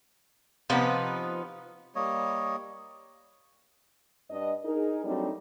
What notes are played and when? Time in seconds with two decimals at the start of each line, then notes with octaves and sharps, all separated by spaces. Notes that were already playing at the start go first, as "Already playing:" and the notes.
0.70 C3 F3 B3 D#4 B4
1.95 G3 A#3 C#5 D#5
4.30 G2 D4 D#5
4.65 D#4 G#4 A#4
5.04 F#3 G3 A3 C4 D4 D#4